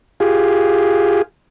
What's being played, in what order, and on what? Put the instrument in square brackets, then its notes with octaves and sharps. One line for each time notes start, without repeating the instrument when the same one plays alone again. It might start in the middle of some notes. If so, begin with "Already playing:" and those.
[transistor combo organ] F4 G4 G#4